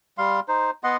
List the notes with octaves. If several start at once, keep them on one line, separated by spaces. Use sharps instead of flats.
G3 F5 C6
D#4 C5
B3 D#5 F#5 C6